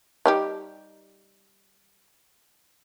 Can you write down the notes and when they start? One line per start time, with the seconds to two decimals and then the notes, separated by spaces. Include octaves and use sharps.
0.26 G3 D#4 G4